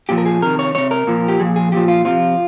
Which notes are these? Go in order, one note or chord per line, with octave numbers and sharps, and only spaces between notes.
A#2 F3 G4
A#4
G#4
C3 D#3 A#4
C#5
C3 D#3 C#5
A#4
A#2 F3
G4
A#2 F3 G#4
G#4
A#2 F3 G4
F4
C3 F3 F4